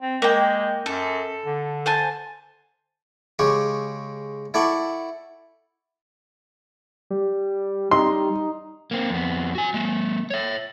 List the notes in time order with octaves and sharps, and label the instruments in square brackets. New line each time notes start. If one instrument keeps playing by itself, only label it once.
[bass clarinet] C4
[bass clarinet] G#3 [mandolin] A#3 G5
[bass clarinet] F#2 [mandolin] A4
[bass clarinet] D3
[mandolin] C5 G#5 A5
[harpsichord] C#3 G#3 G4 C#6
E4 A4 D5 F#5 C#6
[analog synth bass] G3
[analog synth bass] G3 [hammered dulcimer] D#4 [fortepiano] C6
[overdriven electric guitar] A#3 C4
F2 B3
F#4 G#5
G#3 A#3
C#5 E5